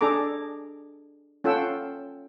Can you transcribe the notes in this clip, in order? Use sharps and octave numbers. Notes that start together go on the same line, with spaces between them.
D4 G#4 A4 A#5 D6
C#4 F4 A4 F#5 G5 E6